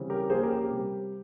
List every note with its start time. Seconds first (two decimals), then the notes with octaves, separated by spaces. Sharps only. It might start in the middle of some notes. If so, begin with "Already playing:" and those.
Already playing: C#3 E3 G3 C4
0.10 G4 A#4
0.30 F3 A#3 C#4 G#4 C5
0.43 G4 A#4
0.57 G4
0.71 C3 G3 C4